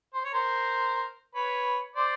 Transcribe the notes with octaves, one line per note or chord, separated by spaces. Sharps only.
C5
C#5
A#4 C5
B4 C#5
C5 D5